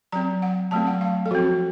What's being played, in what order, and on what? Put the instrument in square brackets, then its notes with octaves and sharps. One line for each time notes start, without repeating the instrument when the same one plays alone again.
[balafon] F#3 C4 A#5
F#5
F#3 A3 C4 A5
F#5
F5
A4
F3 C4 F#4